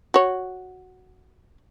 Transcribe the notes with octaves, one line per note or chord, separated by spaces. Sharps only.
F#4 C#5